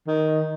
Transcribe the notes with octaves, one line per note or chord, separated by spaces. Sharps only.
D#3